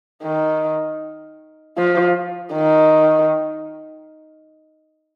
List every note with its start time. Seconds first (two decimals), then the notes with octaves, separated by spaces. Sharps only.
0.23 D#3
1.78 F3
2.54 D#3